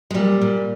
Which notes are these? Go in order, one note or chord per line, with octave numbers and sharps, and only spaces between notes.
G#3
A#2 G3
A#2